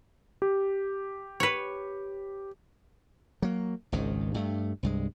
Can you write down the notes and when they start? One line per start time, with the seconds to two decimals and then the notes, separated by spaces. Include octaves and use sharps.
0.42 G4
1.40 B4 C#5
3.42 F#3 A#3
3.92 G#1 C#2 G#2 D#3
4.34 G2 A3
4.83 C2 G2 G#3